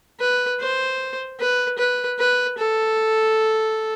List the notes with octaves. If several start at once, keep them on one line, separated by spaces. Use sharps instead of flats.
B4
C5
B4
B4
B4
A4